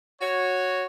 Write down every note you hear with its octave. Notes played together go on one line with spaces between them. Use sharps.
F#4 C#5